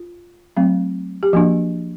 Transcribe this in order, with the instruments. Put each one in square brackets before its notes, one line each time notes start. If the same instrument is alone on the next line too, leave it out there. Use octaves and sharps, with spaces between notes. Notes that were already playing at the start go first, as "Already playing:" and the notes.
Already playing: [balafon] F4
F#3 A3 C4
G4
F3 A#3 D4 F#4